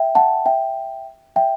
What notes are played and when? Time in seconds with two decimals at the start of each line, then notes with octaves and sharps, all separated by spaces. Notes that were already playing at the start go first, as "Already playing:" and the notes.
Already playing: E5 G5
0.15 F#5 A5
0.46 E5 G5
1.36 E5 G5